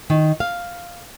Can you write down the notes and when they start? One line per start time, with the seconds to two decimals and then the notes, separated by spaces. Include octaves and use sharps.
0.10 D#3
0.40 F5